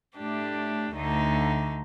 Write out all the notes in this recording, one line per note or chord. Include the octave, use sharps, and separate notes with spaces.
A2 A3 D4 G4
D2 D3 A3 D#4